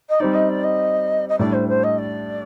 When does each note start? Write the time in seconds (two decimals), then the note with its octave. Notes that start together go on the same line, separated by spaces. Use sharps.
0.09 D#5
0.20 G3 C4 D#4 D5
0.34 D#5
0.49 D5
0.64 D#5
1.29 D#5
1.39 A2 G3 D4 D5
1.53 C5
1.68 C5
1.84 D#5
1.98 D5